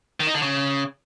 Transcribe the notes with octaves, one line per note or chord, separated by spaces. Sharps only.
D#3
D#4
D3
C#3